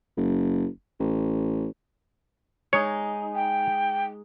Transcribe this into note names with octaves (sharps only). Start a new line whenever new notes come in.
F#1
A1
G#3 D#4 C#5
G5